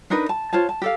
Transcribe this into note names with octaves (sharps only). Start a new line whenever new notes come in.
D4 D#4 A#4 B4
A5
F4 C5 C#5 A5
A5
G4 A4 F5